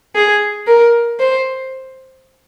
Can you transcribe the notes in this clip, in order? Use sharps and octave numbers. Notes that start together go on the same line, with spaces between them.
G#4
A#4
C5